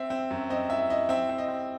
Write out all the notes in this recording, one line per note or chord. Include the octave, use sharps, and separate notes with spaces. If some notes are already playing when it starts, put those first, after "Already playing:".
Already playing: C4 E5
C4
F#2
C4 D#5
E4 E5
E4 D#5
C4 E5
C4
D#5
C4